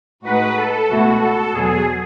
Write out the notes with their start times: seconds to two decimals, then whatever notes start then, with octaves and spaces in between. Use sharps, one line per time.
0.25 A2 G#3 D#4 F#4 B4
0.57 A4
0.89 C#2 B2 A3 E4 F#4
1.22 A4
1.54 E2 B2 F#3 G#4